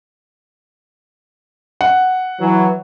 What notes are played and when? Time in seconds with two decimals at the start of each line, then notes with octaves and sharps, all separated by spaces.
1.81 F#5
2.40 E3 F#3